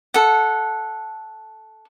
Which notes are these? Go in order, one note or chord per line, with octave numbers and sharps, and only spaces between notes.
A4 F#5